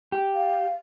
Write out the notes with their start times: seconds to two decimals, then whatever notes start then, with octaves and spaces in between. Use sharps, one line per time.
0.12 G4
0.35 F5